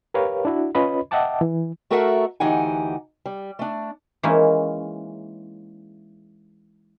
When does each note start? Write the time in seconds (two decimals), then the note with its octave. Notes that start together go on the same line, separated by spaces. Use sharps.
0.14 G4 A#4 B4 C#5 F5
0.45 D4 E4 F#4
0.75 C#4 F4 B4 C#5 D#5 B5
1.11 D#5 E5 F#5 G5 A5 D6
1.41 E3
1.90 A3 F#4 A4 A#4 E5 F#5
2.40 D2 E3 D#4 G4 F#5 G#5
3.26 G3
3.59 A3 D4
4.23 E3 G#3 A#3 C#4 D#4